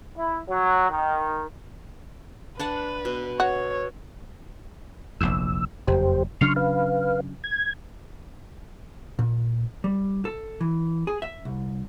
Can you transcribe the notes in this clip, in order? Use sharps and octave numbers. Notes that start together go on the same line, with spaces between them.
E4
F#3
D#3
D4 B4 F#5 A5
B2
F#4 C#5
F1 A#1 E2 E6
F#1 F2 G4 C5
C#3 F#3 D4 C6 C#6 F6
B4 F5
G#6
A#2
G3
A4
E3
G#4
E5
C2